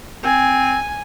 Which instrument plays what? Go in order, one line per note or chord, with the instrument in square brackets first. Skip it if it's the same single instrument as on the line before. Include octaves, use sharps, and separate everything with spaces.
[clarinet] C4 [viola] G#5